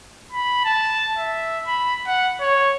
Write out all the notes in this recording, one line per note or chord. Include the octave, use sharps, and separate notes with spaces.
B5
A5
E5
B5
F#5
C#5